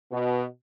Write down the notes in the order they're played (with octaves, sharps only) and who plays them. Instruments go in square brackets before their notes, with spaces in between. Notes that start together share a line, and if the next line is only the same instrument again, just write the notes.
[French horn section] B2